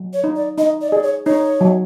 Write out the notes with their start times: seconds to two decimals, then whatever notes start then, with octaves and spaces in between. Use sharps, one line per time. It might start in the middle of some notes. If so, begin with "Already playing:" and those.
Already playing: F#3
0.13 C#5
0.24 D#4
0.36 D5
0.58 D#4 D#5
0.81 D5
0.88 D#5
0.92 G#4 D5
1.03 C#5
1.26 D#4 C#5
1.61 F#3